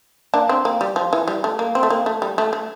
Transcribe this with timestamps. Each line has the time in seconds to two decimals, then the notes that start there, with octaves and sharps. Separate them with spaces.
0.34 A#3 D4
0.49 C4
0.65 A#3
0.81 G3
0.96 F3
1.13 E3
1.28 G3
1.44 A3
1.59 A#3
1.75 C4
1.83 A3
1.90 A#3
2.06 A3
2.22 G3
2.38 A3
2.53 A3